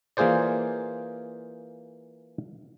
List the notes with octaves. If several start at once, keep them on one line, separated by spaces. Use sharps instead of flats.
E3 A#3 F4 G#4 C5 D5